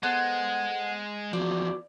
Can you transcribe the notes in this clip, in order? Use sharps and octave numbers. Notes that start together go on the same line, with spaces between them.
G#3 B3 A4 C5 F#5
E2 F3 F#4 D5